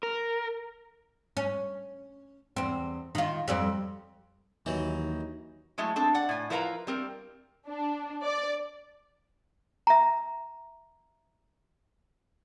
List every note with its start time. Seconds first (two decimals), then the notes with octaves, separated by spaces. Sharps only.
0.03 A#4
1.37 C#4
2.57 E2 C4
3.15 D#3 F4
3.48 F2 G3 C4
4.66 D#2 E3 F#3 D#4
5.78 F#3 G#3 A3 E4
5.96 C4 D4 A4
6.14 D5 F#5
6.29 A2 G#5
6.50 F3 E4 A#4 B4 F5 A#5
6.87 G3 C4 A#4
7.68 D4
8.25 D5
9.87 E5 A#5